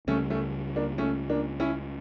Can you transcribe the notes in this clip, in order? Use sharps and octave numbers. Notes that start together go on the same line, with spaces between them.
C#2 C#3 G3 A3 C#4
A3 C#4
A#3 D4
A3 C#4
A#3 D4
C#4 E4